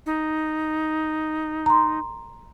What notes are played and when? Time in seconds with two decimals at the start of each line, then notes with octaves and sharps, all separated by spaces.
0.06 D#4
1.66 A#5 C6